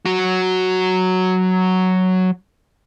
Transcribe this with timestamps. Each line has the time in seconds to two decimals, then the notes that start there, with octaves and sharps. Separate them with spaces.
0.05 F#3 F#4